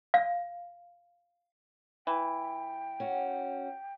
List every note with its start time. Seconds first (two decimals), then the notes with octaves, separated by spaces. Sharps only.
0.14 F5
2.07 E3 G5
3.00 C#4 F#4